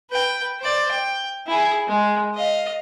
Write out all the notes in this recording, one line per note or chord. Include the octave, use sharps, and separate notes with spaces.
B4 G5
C5 D5
G5
E4 G#4
G#3
D#5 F5